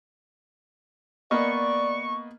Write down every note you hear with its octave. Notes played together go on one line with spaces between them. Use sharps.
A#3 B3 D5 D#5 C#6